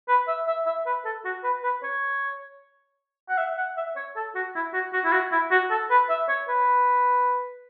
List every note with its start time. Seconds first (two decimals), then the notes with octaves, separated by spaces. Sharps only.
0.08 B4
0.28 E5
0.47 E5
0.66 E5
0.86 B4
1.05 A4
1.25 F#4
1.44 B4
1.63 B4
1.83 C#5
3.29 F#5
3.38 E5
3.58 F#5
3.77 E5
3.96 C#5
4.16 A4
4.35 F#4
4.55 E4
4.73 F#4
4.93 F#4
5.05 E4
5.12 F#4
5.32 E4
5.51 F#4
5.71 A4
5.90 B4
6.09 E5
6.29 C#5
6.48 B4